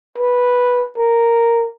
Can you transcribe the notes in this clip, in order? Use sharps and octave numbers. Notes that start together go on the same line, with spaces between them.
B4
A#4